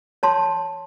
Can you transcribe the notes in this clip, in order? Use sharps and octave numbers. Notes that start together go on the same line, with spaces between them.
C#5 A5 C6